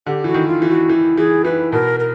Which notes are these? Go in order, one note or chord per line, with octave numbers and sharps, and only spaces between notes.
D3 G4
E3 F#4
D#3
F4
E3
F#4
E3
E3 G#4
E3 B4
B2 A#4
A#4